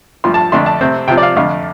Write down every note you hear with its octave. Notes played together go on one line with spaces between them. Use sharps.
G2 F3 A3 C6
A5
F2 D3 A3 D4 C6
A5
C3 A3 C4
C3 F3 C4 G5
D5
F5
F2 D3 A3 F5